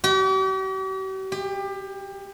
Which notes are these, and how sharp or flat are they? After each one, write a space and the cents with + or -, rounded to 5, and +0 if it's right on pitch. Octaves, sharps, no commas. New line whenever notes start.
G4 -45
G4 +25